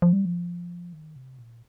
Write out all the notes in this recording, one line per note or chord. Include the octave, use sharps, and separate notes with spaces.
F3
G3
F3
D#3
C3
A#2